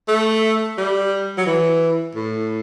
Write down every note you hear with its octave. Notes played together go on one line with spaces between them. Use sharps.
A3
G3
F#3
E3
A2